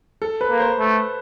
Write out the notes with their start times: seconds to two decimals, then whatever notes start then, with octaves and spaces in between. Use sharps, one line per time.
0.22 A4
0.41 B4
0.51 A#3
0.60 C5
0.79 A3